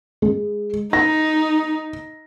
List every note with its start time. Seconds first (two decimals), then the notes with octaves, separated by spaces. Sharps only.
0.22 G#3
0.93 D#4 A#6